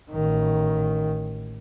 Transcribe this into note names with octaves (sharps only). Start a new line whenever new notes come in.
A1 D#3